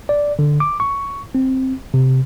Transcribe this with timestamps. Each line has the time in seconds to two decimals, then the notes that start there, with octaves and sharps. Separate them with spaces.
0.09 D5
0.39 D3
0.60 D6
0.80 C#6
1.35 C4
1.94 C3